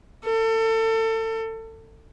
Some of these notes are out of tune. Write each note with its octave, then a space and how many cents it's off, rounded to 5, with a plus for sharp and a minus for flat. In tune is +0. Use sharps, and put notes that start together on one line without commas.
A4 +30